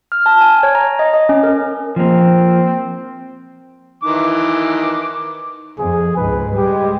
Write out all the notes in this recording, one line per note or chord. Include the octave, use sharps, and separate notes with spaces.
F6
A5
G#5
C#5
A#5
D#5
D#5
C#4
A#4
F3 A#3 C4
D#3 E3 D6
F2 G#4
C#2 G#2 B4
G3 G#3 G4